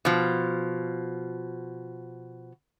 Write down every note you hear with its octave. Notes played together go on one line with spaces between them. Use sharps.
B2 F3